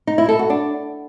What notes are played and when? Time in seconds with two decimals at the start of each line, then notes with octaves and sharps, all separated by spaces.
0.07 D#4
0.18 E4
0.29 A4
0.39 F#4
0.50 D4